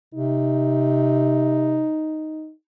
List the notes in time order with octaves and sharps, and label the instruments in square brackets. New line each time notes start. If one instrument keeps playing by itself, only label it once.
[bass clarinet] C3 [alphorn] D#4